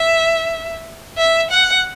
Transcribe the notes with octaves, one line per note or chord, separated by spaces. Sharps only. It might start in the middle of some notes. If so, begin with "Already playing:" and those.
Already playing: E5
E5
F#5